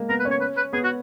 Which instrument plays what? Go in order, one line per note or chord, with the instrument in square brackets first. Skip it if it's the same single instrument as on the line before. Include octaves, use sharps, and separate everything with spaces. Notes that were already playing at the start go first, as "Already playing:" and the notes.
Already playing: [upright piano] G#3 A#3
[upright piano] B3 [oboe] A#4
[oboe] B4
[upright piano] C#4
[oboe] C#5
B4
B4
[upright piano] B3 [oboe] G#4
[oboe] F#4